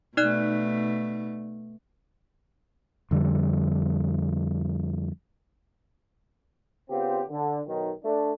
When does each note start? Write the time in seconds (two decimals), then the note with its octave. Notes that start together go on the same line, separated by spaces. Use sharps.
0.17 B2 A3 D#4 D5 F#6
3.11 F2 D3 G3
6.90 C#3 B3 C4 F4 G4
7.29 D3
7.67 B1 D#3
8.04 A3 D4